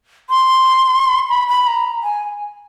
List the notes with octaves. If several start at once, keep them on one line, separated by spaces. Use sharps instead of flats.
C6
B5
B5
A#5
G#5